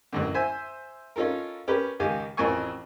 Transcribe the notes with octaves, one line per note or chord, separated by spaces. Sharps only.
A1 F#2 D3
C5 E5 G#5
C#4 D#4 F4 A4 A#4
C#4 G4 A#4 B4
C#2 D#3 D#4 G4 F5 G#5
A1 F2 A#4 G#5 C#6